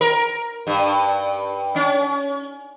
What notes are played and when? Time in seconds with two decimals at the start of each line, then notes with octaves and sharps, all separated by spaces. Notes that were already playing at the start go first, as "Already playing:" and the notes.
0.01 A#4
0.67 G2
1.76 C#4